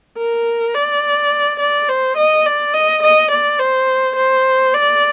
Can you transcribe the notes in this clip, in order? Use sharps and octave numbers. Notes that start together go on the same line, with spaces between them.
A#4
D5
D5
C5
D#5
D5
D#5
D#5
D5
C5
C5
D5